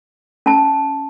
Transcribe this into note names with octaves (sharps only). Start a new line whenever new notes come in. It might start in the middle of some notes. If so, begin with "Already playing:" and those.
C#4 A5